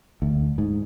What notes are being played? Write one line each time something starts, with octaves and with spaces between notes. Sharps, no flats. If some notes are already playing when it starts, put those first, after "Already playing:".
D2
G#2